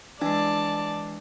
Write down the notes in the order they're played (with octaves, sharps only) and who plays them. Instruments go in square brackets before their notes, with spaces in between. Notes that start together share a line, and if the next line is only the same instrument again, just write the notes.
[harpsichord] E3 G#3 [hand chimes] D4 [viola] D5 A5